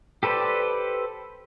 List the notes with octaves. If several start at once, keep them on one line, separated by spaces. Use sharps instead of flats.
G4 A4 B4 C5 D5